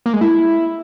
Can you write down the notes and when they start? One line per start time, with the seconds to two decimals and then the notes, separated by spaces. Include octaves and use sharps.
0.06 A#3
0.13 G#3
0.21 E4